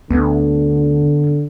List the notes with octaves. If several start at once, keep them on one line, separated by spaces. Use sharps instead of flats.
D2 D3 B3